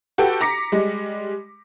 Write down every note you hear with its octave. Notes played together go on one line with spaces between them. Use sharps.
F#4 G4 A4 B4 G5
A#5 D6 A#6 B6 C#7
G3 G#3